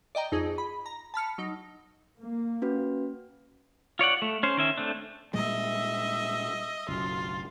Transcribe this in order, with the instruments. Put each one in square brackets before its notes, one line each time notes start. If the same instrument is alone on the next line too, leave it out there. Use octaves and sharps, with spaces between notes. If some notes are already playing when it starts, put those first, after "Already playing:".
[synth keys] D5 D#5 G5 A#5
F2 D#4 G#4
B5
A#5
A5 B5 F6 C#7
F#3 D#4
[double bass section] A#3
[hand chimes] C#4 F#4 B4
[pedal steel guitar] F4 C#5 D5 F#5
A3
C#4 C5
D#3 C#4 E5
A3 C4 D4
[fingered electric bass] A#2 G3 G#3 [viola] D#5 E5
[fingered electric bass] F#1 B1 F#2 [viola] F4